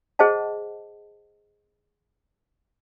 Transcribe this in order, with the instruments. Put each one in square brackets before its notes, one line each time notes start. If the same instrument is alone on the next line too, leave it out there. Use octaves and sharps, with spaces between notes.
[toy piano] G#4 C5 D#5 F#5 A5